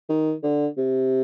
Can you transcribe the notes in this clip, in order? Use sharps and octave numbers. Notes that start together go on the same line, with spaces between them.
D#3
D3
C3